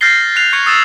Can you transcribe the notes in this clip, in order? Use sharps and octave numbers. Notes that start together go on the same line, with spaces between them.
F6 G6 A6 A#6 C7 G7
F#6 C7 F7
C#6 G6 G#6 C#7 F7
D#6 E6 A6 E7